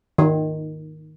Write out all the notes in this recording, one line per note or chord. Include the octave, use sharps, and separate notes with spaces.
D#3